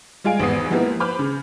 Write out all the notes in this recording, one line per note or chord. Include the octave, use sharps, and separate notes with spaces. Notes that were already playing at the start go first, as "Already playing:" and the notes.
G3 G#3 F4 G#5 D7
G#1 E2 B3 D#6 C7
F3 G#3 A#3 B3 E4 G4
B4 C5 B5 D6 F6 G6
C#3